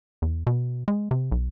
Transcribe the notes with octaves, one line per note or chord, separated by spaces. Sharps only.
E2
B2
G#3
C3
B1